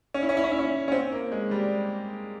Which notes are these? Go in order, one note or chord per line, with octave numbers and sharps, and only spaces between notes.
C#4
E4
C#4
E4
C#4
E4
C#4
C#4
C4
A#3
G#3
G3